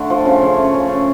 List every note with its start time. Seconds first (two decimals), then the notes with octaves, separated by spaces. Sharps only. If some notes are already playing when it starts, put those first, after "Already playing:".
Already playing: D3 A3
0.10 F3
0.25 C#3
0.42 C#3
0.57 A3
0.74 C#3
0.89 C#3